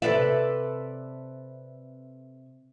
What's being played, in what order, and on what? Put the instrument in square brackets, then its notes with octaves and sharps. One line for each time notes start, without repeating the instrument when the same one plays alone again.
[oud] C3 E5 [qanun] A4 B4 D5